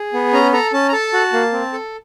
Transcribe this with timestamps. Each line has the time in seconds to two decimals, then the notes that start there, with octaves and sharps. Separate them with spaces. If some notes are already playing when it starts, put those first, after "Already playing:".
Already playing: G#4
0.13 B3
0.33 C#4 A#5
0.53 A4 A#5
0.73 C#4 A5
0.88 A#5
0.93 A4 A5
1.13 F#4
1.33 A#3
1.53 C4
1.73 A4